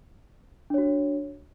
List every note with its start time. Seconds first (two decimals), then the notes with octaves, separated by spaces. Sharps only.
0.70 D4
0.74 C#5
0.78 F#4